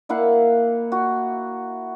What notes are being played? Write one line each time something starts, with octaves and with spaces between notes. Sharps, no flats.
A#3 E4 F5 F#5
F#4